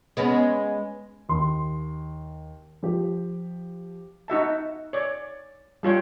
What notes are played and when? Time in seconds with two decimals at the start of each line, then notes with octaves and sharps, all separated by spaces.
0.17 G#3 B3 C#4
1.29 D#2 C6
2.83 F3 G4
4.28 D#4 F#4 E5 A5
4.93 C#5 D5
5.83 G3 F4 C#5 G5